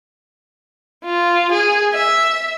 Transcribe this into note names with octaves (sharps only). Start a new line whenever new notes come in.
F4
G#4
E5